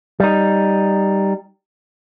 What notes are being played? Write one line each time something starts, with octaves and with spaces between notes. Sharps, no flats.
G3 D#4